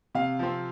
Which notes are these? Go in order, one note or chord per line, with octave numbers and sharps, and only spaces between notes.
C3 F5
F3 C4